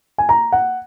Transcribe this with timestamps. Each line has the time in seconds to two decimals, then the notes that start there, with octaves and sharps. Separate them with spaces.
0.18 G#5
0.29 A#5
0.52 F#5